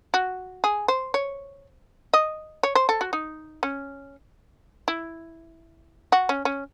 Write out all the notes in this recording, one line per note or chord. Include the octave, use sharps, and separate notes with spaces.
F#4
G#4
C5
C#5
D#5
C#5
C5
A4
F#4
D#4
C#4
E4
F#4
C#4
C#4